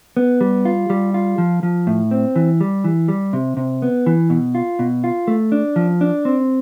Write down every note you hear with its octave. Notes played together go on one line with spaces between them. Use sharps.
B3
G3
F4
G3
F4
F3
F3
A2
C4
E3
G3
E3
G3
C3
C3
B3
E3
B2
F4
B2
F4
A3
D4
F3
D4
C4